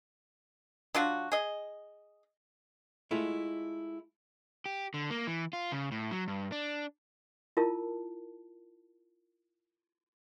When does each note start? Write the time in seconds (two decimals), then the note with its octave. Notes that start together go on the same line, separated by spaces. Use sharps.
0.94 F#3 D4 F4 F#4
1.32 G#4 D#5
3.11 G#3 A3 E4 F4
4.66 G4
4.94 D3
5.11 A#3
5.27 E3
5.53 F4
5.72 C#3
5.92 A2
6.11 F#3
6.28 G2
6.52 D4
7.57 E4 F4 A#4 A5